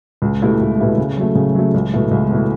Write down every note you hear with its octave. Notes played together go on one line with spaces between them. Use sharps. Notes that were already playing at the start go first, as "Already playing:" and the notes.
C#2
B2 A3 E4 G4
C#2
B2 A3 E4 G4
C#3
F#3 A3
C#3
F#3 A3
C#2
B2 A3 E4
C#2
B2 A3 E4